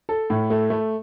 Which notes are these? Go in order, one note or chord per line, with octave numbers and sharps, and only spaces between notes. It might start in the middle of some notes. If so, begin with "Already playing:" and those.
A4
A2
A3
A3